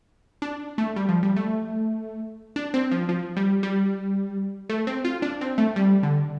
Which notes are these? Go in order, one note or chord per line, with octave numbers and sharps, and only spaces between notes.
D4
A3
G3
F3
G3
A3
D4
C4
F3
F3
G3
G3
A3
C4
F4
D4
C4
A3
G3
D3